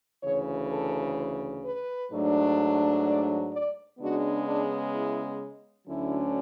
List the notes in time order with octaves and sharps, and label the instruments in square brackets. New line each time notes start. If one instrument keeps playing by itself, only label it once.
[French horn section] D2 C#3 E3 C#5
A4
B4
G#2 F#3 A3 D4
D5
D5
C#3 G#3 B3 D4 F#4
D4
E4
D2 D3 F#3 C#4 E4